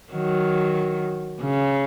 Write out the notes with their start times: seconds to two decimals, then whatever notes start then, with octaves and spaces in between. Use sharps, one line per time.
0.13 D#3 F#3
1.41 C#3